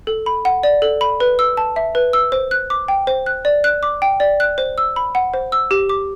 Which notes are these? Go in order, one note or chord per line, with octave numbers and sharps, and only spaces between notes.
A4
B5
F#5
D5
A4
B5
B4
E6
A5
E5
B4
E6
C5
F#6
D6
G5
C5
F#6
D5
F#6
D6
G5
D5
F#6
C5
E6
B5
F#5
C5
E6
G4
D6